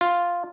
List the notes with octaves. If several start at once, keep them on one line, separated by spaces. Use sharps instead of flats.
F4